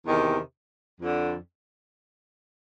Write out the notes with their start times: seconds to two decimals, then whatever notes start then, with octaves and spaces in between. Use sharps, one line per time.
0.05 E2 C3 D#3
1.01 F2 D3